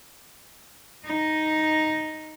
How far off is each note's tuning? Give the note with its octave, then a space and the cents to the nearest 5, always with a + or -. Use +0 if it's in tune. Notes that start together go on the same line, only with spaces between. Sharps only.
D#4 +0 D#5 +0